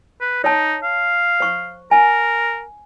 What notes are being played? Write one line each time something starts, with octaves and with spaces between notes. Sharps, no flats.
B4
D#4 C#5 A5
F5
C5 C#6
A#4 G#5